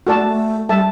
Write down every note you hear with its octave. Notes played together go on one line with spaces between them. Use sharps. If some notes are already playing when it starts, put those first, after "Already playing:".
A3 F#4 A4 D5 A5
A3
A3
G3 A4 E5 A5